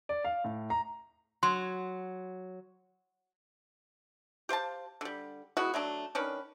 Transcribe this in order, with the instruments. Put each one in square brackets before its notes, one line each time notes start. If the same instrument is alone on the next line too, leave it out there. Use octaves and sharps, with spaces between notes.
[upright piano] D5
F5
A2
A#5
[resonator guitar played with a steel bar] F#3 [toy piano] C6
[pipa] G4 C5 F5 A5
D3 G3
G#3 B3 E4 F#4
F#3 A3 D4
D#3 C#4 D4 B4